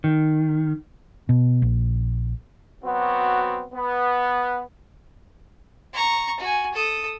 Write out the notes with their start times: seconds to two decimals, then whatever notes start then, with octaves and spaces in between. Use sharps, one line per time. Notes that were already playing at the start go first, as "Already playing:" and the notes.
0.04 D#3
1.29 B2
1.62 A#1
2.84 F#3 B3 C4 F#4
3.74 B3
5.94 A#5 C#6
6.40 F#4 G#5
6.73 A4 D#6